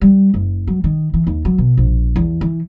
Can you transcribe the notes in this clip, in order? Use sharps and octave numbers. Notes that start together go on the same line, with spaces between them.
G3
F#1
F#3
D#3
E3
D#2
F#3
B2
A#1
E2
E3